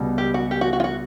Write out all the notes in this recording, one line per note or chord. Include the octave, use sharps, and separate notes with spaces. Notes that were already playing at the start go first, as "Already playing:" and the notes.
Already playing: C#2 B2 G3
G4
F#4
G4
F#4
F#4
F4
F#4